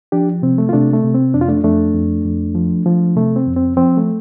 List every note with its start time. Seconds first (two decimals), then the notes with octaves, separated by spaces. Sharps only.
0.12 F3 D4 G4
0.42 C3 C4
0.58 A3
0.69 F4
0.73 C3 A3 D4
0.93 A3
1.04 C3
1.14 C4
1.34 F2 D4
1.41 F4
1.48 A3 D4
1.64 F2 A3 D4
1.95 F2
2.25 F2
2.55 F3
2.86 F3
3.16 C3 A3
3.36 C4
3.47 F2
3.56 C4
3.77 F3 C4
3.97 A3